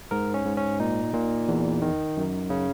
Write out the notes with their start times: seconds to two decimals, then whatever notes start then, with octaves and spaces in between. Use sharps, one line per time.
0.11 G#2 A#4
0.34 C#4
0.45 G#2
0.57 C#4
0.80 A#2 D#4
1.14 A#2
1.48 E2
1.82 D#3
2.17 F#2
2.50 C#3